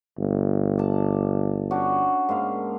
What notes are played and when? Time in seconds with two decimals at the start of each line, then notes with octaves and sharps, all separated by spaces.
0.18 G1
0.78 D5 A5
1.71 C#4 D4 F#4
2.29 G#2 A#3 F5